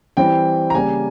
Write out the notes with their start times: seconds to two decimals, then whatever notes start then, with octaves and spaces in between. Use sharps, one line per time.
0.17 E3 G3 C4 E4 G5
0.70 A#5
0.74 C#3 G3 A#3 G#5